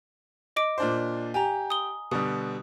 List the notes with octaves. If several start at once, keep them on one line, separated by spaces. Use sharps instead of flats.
D#5 D6 D7
A#2 D4 C5
G4 G#5 A#5
D#6 G7
B2 D3 G3 D#6